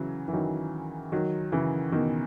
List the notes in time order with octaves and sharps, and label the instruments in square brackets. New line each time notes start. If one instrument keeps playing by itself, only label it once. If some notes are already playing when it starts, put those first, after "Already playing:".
Already playing: [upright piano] C#3 E3 F#3
E3
D#3 F#3
D#3 F#3
C#3 E3
B2 D#3